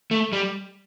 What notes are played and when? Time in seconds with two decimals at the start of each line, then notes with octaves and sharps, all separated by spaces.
0.11 A3
0.33 G3